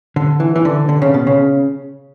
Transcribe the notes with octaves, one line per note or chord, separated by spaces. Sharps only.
D3
E3
E3
D3
D3
C#3
B2
C#3